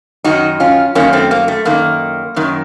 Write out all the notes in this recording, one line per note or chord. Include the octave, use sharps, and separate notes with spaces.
F#2 D#3 D#4 F#4
C#4 F4
F#2 D#3 A#3 C#4
A3 C4
A#3
A3
F#2 D#3 A#3
F#2 D#3